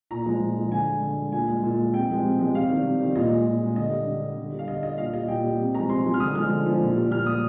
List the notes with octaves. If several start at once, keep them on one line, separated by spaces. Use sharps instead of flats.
A#2 A#5
F3 G#3
A#2
F3 G#3
D3 G#5
G#3
D3
G#3
A#2 G#5
G#3
A#2
G#3
C3 G5
F3 G#3
C3
F3 G#3
C3 F5
D#3 G3
C3
D#3 G3
A#2 D#5
G#3
A#2
G#3
D3 D#5
G3
D3
G3
D3
G3
F5
D3 D#5
G3 D#5
A#2 F5
G3 D#5
A#2 G5
G3
C3
F3 G#3 A#5
C3 C6
F3 G#3
F6
D3 D#6
F3 G#3 F6
D3
F3 G#3
A#2
G3
A#2 F6
G3 D#6